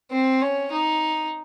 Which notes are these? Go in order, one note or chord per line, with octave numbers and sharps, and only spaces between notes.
C4
C#4
D#4